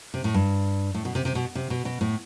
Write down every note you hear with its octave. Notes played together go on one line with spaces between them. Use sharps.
C3
A2
G2
A2
B2
C3
C3
B2
C3
B2
B2
A2